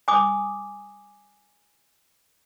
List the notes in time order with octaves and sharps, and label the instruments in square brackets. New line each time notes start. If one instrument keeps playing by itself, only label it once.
[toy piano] G#5 D6 D#6